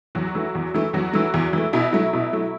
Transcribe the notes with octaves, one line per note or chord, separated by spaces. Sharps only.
E2 F#3 F#4
E3 A3
E2
E3 A3
E2 F#3 F#4
E3 A3
E2
E3 A3
B2 E4
F#3 A3
B2
F#3 A3